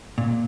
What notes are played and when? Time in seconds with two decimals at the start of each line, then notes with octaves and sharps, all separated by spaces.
0.18 A#2